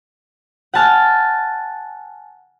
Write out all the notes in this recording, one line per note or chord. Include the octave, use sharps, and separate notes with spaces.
F#5 G#5 A5 F6